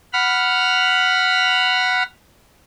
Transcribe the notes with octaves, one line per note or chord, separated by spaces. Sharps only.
F#5 B5 F6